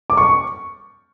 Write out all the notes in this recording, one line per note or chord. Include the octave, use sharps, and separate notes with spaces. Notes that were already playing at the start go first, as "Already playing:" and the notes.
D6
C#6